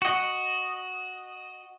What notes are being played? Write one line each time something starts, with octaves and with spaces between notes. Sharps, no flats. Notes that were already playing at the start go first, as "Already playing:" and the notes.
F#4 D#5